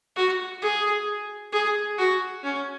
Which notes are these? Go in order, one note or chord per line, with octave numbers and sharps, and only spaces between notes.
F#4
G#4
G#4
F#4
C#4